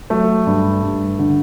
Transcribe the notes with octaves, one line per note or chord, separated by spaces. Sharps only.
F#3 A3
G2
G2
D3